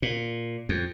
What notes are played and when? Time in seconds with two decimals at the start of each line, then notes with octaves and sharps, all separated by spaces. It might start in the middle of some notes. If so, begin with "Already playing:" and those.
0.02 A#2
0.69 F2